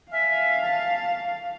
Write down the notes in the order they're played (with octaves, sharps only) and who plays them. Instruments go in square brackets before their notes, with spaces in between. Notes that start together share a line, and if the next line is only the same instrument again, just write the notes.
[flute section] E5 G#5 F6 [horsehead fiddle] F5
[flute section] A5